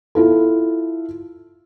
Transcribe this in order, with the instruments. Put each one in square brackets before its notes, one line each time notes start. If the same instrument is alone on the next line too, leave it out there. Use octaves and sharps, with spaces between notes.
[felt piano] E4 F4 A4